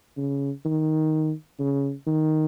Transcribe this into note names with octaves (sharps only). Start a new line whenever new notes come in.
C#3
D#3
C#3
D#3